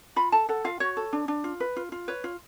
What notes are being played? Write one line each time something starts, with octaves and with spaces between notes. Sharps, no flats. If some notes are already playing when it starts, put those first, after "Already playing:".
F4 B5
A4 A5
A4 F#5
F4 F5
F#4 C#5
A4
D4
D4
F4
B4
F4
F4
B4 C#5
F4